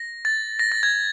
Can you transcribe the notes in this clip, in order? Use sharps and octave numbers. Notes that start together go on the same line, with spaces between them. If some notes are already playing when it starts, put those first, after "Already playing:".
Already playing: A#6
A6
A#6
A6
G#6